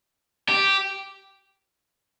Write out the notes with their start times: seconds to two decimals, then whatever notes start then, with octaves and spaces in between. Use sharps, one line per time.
0.49 G4